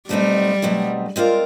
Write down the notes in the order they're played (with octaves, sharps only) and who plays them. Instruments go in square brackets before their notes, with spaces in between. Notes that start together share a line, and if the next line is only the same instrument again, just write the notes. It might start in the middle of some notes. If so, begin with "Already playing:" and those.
[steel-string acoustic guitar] B2 F#3 A3 C4 D#4 [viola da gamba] G3
[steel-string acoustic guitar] B2 F#3 A3 C4 D#4
G#3 C4 F4 A#4 D5